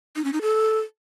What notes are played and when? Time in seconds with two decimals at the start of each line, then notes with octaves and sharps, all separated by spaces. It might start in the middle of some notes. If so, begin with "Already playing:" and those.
0.16 D#4
0.24 C#4
0.33 D#4
0.42 A4